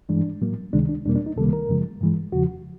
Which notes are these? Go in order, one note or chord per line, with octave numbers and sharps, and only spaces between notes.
G2 E3 G#3 D4
A2 F#3 A#3
C#2 C3 D#3 G#3 D4
D4
E2 B2 G3 A#3 D4
D4
D#4
C#2 C3 D#3 G3 A#3 A4
A#4
F#2 C#3 F3 G#3
G2 E3 G#3
E2 C#3 F3 F#4